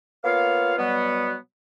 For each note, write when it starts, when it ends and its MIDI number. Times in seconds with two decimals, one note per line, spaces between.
0.24 0.74 58
0.24 0.74 59
0.24 0.74 65
0.24 0.74 73
0.24 0.74 77
0.78 1.36 47
0.78 1.36 54
0.78 1.36 55
0.78 1.36 59